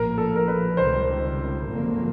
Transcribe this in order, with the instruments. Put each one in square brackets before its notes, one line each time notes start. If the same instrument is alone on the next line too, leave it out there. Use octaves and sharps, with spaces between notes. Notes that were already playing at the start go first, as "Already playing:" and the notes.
Already playing: [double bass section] A#1 A2 F3 A#3 [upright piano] A#4
[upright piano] A4
A#4
B4
[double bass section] C#2 C3 D#3 G3 [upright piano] C5
[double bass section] G#1 F#2 D3 F3 A#3